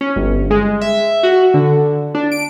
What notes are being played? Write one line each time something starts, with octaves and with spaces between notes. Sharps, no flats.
C#4
G1
G#3
E5
F#4
D3
D4
D7